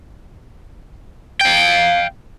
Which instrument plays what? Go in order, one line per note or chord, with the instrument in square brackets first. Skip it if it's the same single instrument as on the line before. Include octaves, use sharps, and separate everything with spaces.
[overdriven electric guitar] F5 G5